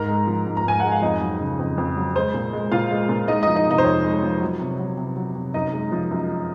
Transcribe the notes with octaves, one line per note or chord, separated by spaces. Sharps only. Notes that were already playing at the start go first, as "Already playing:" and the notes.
Already playing: G#2 A#4 A#5
G#3
F3
G#2
A#5
G#2 G#5
G#3 F#5
F5
F2 D#4 D#5
F#3
C#3
F2
F2
F#3
G#3 C5
A#2
G#3
A#2 F4 F5
G#3
A#2
G#3 D#4 D#5
F3 D#4 D#5
D#4 D#5
C3 D#4 D#5
C5
F2 C#5
G#3
F3
F#3
C3
F#3
C3
F#3
C3
F#2 D#4 D#5
G#3
F3
F#2